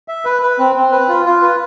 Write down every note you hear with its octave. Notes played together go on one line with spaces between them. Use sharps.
E5
B4
B4
C4
C4
B4
F4
F4
B4